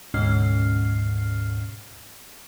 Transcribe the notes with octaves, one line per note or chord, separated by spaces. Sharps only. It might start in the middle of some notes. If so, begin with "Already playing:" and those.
D2 G#2 B2 C#4 F6 C7